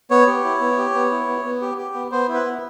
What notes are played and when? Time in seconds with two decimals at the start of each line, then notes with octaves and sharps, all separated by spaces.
0.10 B3 C#5
0.27 G4
0.44 E4
0.61 B3
0.78 G4
0.94 B3
1.11 E4
1.28 B3
1.45 B3
1.61 G4
1.78 G4
1.94 B3
2.11 B3 C5
2.28 E4
2.34 B4
2.45 B3